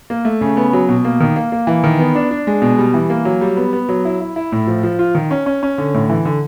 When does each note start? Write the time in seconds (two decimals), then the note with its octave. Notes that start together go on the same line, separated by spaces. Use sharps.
0.10 A#3
0.25 A3
0.41 C#3
0.57 B3
0.73 F#3
0.89 B2
1.05 A#3
1.20 D#3
1.36 A#3
1.52 A#3
1.67 E3
1.84 D#3
1.99 B3
2.15 D4
2.31 D4
2.47 G#3
2.62 B2
2.78 G3
2.94 E3
3.10 A#3
3.25 F#3
3.41 G3
3.57 B3
3.73 B3
3.89 F#3
4.05 E4
4.20 E4
4.36 E4
4.52 A2
4.67 F3
4.83 F3
4.99 F4
5.15 D#3
5.31 C#4
5.46 C#4
5.63 C#4
5.78 D3
5.94 A2
6.10 E3
6.25 D3